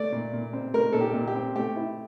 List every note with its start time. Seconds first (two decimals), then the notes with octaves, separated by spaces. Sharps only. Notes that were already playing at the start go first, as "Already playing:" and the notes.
Already playing: A3 D5
0.12 A#2
0.33 A#2
0.53 C4
0.74 A3 A#4
0.92 A#2 A4
1.01 G4
1.14 A#2
1.28 G4
1.35 C4
1.56 A3 G4
1.76 E4